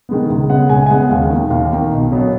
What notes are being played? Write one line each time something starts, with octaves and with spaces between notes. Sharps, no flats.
D#3 G#3 B3
C#2
C#3 G#3 B3 F#5
C#2 G#5
G#5
C#3 G#3 B3 F#5
D#2 F5
D#3 A#3
D#2 F5
D#3 A#3
B1
B2 F#3 B3